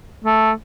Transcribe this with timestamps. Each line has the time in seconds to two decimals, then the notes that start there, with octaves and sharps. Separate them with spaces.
0.24 A3